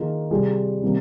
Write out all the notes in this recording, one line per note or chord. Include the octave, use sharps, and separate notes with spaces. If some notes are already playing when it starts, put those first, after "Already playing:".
Already playing: D#3 A#3 F4 G#4
C3 G3 C4 F4 G#4
C3 D#3 G3 A#3